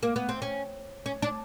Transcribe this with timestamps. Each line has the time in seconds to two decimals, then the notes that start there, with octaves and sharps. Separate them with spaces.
0.03 A#3
0.16 B3
0.29 C4
0.42 C#4
1.06 C#4
1.22 D4